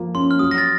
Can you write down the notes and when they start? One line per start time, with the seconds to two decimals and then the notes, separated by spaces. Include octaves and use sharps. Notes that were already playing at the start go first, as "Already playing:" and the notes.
Already playing: F3 A#3
0.15 C#4 C6
0.31 F6
0.39 F#3 D#6
0.51 A#6
0.58 A6